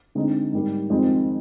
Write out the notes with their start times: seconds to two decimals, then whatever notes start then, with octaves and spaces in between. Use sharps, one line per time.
0.15 D3 G#3 C4 D#4
0.53 G#2 G3 A#3
0.90 F2 D#3 G#3 C4